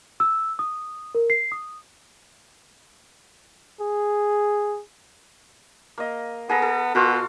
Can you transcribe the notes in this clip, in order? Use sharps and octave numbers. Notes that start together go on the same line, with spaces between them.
E6
D#6
A#4
C7
D#6
G#4
A#3 D#5
B3 G#4 A4 A#5
A4
B2 F4 F#4 A4